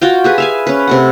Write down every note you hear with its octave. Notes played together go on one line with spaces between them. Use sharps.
F4 F#4 F5 G5
G4 G#4 B4
E5 F5 G#5
C#4 B4
C3 A3 F#5